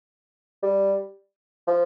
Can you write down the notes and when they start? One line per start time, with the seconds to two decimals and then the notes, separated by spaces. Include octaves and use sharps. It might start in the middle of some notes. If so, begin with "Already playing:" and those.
0.62 G3
1.67 F3